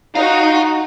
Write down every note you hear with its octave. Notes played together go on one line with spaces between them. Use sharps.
D#4 F4 F#4 F5